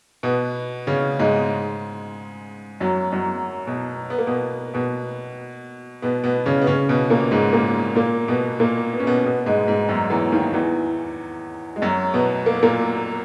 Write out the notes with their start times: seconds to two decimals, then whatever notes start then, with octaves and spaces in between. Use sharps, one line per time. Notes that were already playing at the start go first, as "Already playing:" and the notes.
0.23 B2 B3
0.87 C#3 C#4
1.19 G#2 G#3
2.81 F#2 F#3
3.12 F#2 F#3
3.67 B2
4.10 B3
4.18 A#3
4.27 B2 B3
4.74 B2 B3
6.02 B2 B3
6.24 B2 B3
6.46 C#3 C#4
6.62 B3
6.67 C#3 C#4
6.89 B2 B3
7.10 A#2 A#3
7.31 G#2 G#3
7.53 A#2 A#3
7.95 A#2 A#3
8.28 B2 B3
8.60 A#2 A#3
8.93 B3
9.00 C#4
9.06 B2 B3
9.25 B2 B3
9.46 G#2 G#3
9.68 G#2 G#3
9.89 F#2 F#3
10.10 E2 E3
10.32 D#2 D#3
10.53 E2 E3
11.76 G#3
11.82 F#2 F#3
12.14 B2 B3
12.46 A#3
12.55 B3
12.63 A#2 A#3